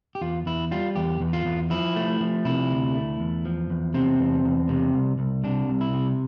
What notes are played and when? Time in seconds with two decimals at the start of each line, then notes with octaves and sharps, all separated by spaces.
0.15 G4
0.21 E2 F4
0.46 E2 E4
0.71 G3 F4
0.96 E2 G4
1.21 E2
1.33 F4
1.45 E2
1.70 F3 E4
1.96 A3
2.21 F3
2.45 C3 E4
2.70 D2
2.95 A3
3.20 E2
3.45 F3
3.70 E2
3.94 C3 C4
4.19 E2
4.44 E2
4.69 C3
4.94 C2
5.19 C2
5.44 C3 D4
5.69 C2
5.81 E4
5.94 C3